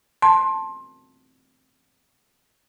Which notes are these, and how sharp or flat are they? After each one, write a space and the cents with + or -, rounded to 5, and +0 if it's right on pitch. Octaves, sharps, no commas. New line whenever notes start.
A5 +0 C6 +20